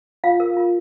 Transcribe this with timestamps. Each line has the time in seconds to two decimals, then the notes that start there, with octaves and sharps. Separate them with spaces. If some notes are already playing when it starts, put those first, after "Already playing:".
0.24 F4 F5
0.40 A#4
0.57 F4